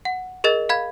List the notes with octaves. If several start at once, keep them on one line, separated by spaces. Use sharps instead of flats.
F#5
G#4 A#4 D#5 A6
F5 B5 G#6